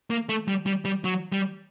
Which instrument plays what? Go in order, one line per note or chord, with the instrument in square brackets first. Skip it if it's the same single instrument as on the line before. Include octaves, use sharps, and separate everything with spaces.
[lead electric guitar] A#3
A3
G3
G3
G3
F#3
G3